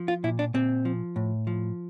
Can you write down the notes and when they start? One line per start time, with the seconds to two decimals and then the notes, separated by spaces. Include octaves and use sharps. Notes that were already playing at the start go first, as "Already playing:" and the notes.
Already playing: F3
0.08 F4
0.24 A#2 E4
0.39 D4
0.54 A#2 C4
0.85 F3
1.16 A2
1.47 F3